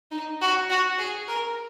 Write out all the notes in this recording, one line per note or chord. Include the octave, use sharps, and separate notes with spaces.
D#4
F#4
F#4
G#4
A#4